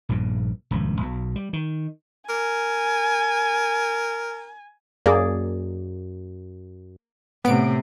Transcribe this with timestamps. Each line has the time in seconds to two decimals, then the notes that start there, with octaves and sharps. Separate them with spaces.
0.09 A#1 G2 A#2
0.71 D#1 C#2 G2 F3
1.01 B1 B2
1.36 G3
1.53 D#3
2.29 A#4 G#5
5.06 F#2 A#3 G#4 D5
7.45 A2 C3 B3 D7